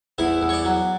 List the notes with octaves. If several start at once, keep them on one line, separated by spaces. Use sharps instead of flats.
E2 E4
E2
C#5
D5
F#3